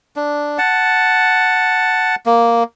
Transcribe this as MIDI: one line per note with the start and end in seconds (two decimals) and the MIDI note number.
0.16 0.58 62
0.58 2.15 78
0.58 2.15 81
2.26 2.63 58